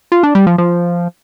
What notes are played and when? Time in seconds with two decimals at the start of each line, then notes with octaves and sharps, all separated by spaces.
0.12 F4
0.23 D4
0.35 G3
0.47 F3
0.58 F3